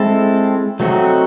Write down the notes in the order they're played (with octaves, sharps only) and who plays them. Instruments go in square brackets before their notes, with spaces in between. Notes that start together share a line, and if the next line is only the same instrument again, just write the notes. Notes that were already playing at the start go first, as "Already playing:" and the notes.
Already playing: [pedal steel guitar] G#3 C4 E4 A4
F#3 A3 C4 D#4 F#4